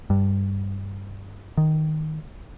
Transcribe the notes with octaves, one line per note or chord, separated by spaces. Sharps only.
G2
D#3